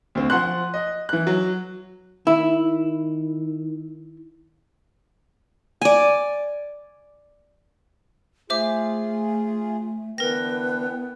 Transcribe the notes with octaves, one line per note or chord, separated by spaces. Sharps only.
D2 C4
F3 F#5 C6 F#6
D#5
E3 F#6
F#3
D#3 E4
D5 G#5
A3 F4 G#4 C5 E5 D6
D3 E3 B3 A#4 B4 G5 A#6